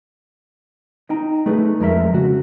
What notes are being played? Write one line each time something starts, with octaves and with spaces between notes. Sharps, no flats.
D#4 G5 A#5
A3 D#4 G#4 B4
F2 G#3 A#4 E5
C#3 F#4